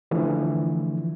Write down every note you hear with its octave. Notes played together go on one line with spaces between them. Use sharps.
D3 E3 F3 A3